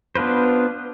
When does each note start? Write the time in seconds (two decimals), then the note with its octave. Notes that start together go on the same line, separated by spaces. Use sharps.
0.15 B3 D4 F4 B4 C5